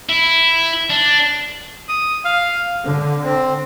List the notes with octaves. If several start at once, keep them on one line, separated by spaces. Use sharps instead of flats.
E4
D4
D#6
F5
D3
C4